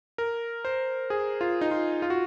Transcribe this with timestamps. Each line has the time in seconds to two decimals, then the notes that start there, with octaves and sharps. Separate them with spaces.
0.18 A#4
0.65 C5
1.10 G#4
1.41 F4
1.61 D#4
1.71 F4
2.02 F4
2.10 F#4